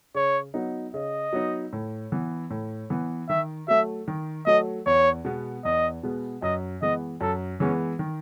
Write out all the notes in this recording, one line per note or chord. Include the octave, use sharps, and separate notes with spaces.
C#3 C#5
F#3 B3 D#4
C#3 D#5
F#3 B3 D#4
A2
E3 B3
A2
E3 B3
D#3 E5
F#3 A3 E5
D#3
F#3 A3 D#5
E2 C#5
B2 G#3 B3
E2 D#5
B2 G#3 B3
F#2 D#5
E3 G#3 B3 D#5
F#2 A4
E3 G#3 B3 C#4
D#3